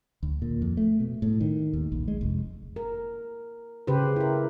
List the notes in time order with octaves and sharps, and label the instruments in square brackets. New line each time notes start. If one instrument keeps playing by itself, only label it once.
[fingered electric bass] D2
A#2
F2
A3
B2
A2
D#3
D#2
A#1
G#3
F1
[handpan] A#4
C#3 G4 B4 C5
E4 A#4